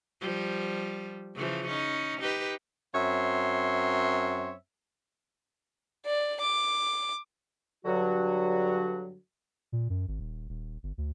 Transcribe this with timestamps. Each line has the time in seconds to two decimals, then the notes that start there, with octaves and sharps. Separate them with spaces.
0.21 F3 G3
1.36 C#3 E3 F3
1.67 C#4 D#4
2.20 D#4 G4 B4
2.95 F#2 C4 C#5 E5 C6
6.06 D5
6.41 D6
7.85 G2 D3 F#3 F#4
9.72 A#2
9.90 F#2
10.08 G#1
10.20 D#1
10.49 D#1
10.83 G1
10.98 D2